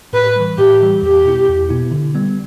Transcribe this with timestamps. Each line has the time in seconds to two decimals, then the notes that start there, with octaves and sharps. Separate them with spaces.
0.13 A2 B4
0.36 E3 G3
0.58 A2 G4
0.80 E3 G3
1.02 E2 G4
1.24 B2 B3 E4
1.48 E2
1.69 B2 B3 E4
1.91 D3
2.15 G3 B3